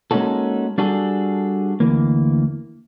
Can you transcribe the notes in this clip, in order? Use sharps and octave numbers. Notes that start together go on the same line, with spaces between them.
G#3 A#3 C#4 D#4 F#4 A4
G3 D4 F#4 G#4 A4
D2 E3 A#3